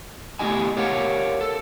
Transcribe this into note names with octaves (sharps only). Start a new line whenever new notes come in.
A3 B3 E4 G4 D#5 G#5
G4 A#4 C#5 D5 F5 F#5
A4